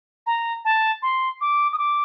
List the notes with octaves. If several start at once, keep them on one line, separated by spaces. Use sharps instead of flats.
A#5
A5
C6
D6
D#6
D6